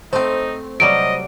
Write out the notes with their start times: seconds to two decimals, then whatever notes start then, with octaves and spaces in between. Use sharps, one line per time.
0.13 A3 C4 D#4 C5
0.80 C3 F#3 G3 D#5 D7